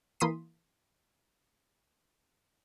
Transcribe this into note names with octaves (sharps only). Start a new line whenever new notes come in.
E3 A#3 C6 D#6 B6 D#7